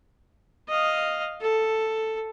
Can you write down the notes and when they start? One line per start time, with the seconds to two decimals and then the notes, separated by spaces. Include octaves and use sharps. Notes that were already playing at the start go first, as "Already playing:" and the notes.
0.68 D#5 F5
1.41 A4